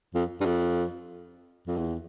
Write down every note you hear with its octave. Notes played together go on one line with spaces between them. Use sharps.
F2
G2
F2
F2
E2